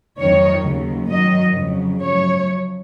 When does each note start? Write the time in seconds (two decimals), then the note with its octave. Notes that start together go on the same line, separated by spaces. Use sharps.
0.19 F2 D#3 F#3 C#5
0.65 D#2 C#3 F#3
1.11 F#2 D#3 F#3 D#5
1.57 F2 C#3 F#3
2.02 F#2 F3 C#5